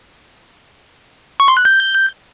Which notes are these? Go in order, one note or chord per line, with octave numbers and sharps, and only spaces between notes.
C#6
C6
F#6
G6